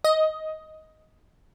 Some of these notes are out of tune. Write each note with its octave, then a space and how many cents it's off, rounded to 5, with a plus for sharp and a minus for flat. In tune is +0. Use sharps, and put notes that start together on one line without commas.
D#5 +10